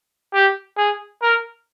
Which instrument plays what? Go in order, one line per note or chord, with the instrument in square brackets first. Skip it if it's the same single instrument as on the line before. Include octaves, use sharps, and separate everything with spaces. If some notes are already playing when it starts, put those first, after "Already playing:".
[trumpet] G4
G#4
A#4